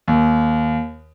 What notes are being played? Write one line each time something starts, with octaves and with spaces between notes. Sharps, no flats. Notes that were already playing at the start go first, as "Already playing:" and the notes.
D#2